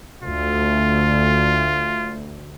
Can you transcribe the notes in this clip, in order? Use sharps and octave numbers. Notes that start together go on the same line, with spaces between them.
D2 F4